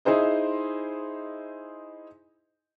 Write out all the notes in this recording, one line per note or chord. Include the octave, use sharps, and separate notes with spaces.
D#4 E4 G#4 C5 D#5